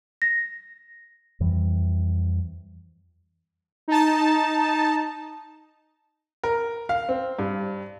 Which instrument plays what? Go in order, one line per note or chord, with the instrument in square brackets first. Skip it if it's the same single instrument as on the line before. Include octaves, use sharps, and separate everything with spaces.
[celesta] A#6
[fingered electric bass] F2 E3 G3
[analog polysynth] D#4 A5
[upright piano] A#4
F5
C4
G2